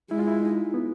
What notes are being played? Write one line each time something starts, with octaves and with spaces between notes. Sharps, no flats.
G#3 E4
F4
E4
D#4
B3